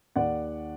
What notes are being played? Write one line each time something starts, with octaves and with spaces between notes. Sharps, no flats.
D#2 D#3 D5 F#5